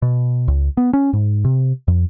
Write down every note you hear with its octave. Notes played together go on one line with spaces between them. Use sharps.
B2
C#2
B3
C#4
G#2
C3
F2